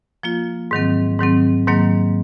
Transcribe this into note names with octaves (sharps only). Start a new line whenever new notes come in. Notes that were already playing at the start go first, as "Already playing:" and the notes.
F3 A#3 F4
G#2 D#3 F#3 C4
G#2 D#3 F#3 C4
G#2 D#3 F#3 A#3